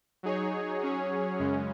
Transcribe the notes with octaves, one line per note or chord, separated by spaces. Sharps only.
F#3 D#4 G#4 C#5
F#3 C#4 G#4 C#5
F#2 C#3 G#3 C#4